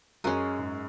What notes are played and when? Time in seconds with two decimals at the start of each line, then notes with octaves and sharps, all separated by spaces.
0.24 F#2 G#3 C#4 F#4 A#4
0.59 G#2